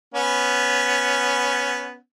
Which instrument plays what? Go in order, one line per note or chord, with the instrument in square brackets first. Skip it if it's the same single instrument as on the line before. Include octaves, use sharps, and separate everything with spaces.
[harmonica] B3 C#4